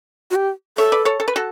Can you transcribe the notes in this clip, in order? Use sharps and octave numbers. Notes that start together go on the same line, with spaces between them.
F#4
G4
A4 C#5 E5
B4 D5
A4 C#5
A4
B4
F#4 A4